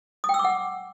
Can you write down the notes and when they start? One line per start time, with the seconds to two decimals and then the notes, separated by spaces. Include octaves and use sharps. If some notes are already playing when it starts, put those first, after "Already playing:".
0.24 D#6
0.29 G5
0.34 E6
0.39 D6
0.44 F#5